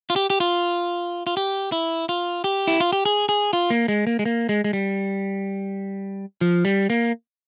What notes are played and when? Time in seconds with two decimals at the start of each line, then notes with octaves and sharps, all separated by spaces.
0.10 F4
0.16 G4
0.30 G4
0.40 F4
1.27 F4
1.37 G4
1.72 E4
2.09 F4
2.44 G4
2.67 E4
2.80 F4
2.93 G4
3.05 G#4
3.29 G#4
3.53 F4
3.70 A#3
3.88 G#3
4.07 A#3
4.19 G#3
4.25 A#3
4.49 G#3
4.64 G#3
4.73 G3
6.41 F3
6.65 G3
6.90 A#3